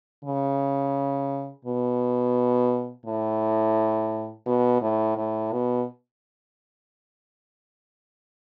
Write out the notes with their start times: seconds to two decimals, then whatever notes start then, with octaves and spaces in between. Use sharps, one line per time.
0.24 C#3
1.65 B2
3.06 A2
4.46 B2
4.82 A2
5.17 A2
5.52 B2